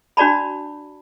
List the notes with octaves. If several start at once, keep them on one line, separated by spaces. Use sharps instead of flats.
D4 F#4 D5 A5 B5